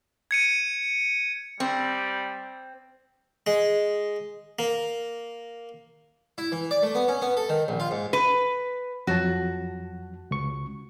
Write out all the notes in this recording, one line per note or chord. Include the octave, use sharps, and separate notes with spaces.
G#6 C#7 D#7
G3 C4
G#3
A#3
E4
E3
D5
A3
B3
C#4
B3
A4
D#3
A#1
F4
G#2
B4
F2 F#3 F#4 A5
C#2 C#6